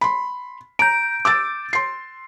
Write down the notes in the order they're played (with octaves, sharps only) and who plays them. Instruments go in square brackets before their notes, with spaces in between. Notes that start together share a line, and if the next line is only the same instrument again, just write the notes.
[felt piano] B5 C6
[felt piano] A#5 [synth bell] G6 D7
[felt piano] D6 E6 A6
C6 C7